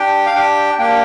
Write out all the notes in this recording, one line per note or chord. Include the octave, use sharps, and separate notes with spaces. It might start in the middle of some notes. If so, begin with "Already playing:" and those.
Already playing: D4 G4 G5
F5
D4 G4 G5
A#3 D4 G4 G5